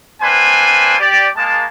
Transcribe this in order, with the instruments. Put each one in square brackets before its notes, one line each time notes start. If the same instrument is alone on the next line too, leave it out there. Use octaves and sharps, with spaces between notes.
[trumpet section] A#3 C4 D4 B4 C5 G#5
G4 D5
G#3 A#3 A5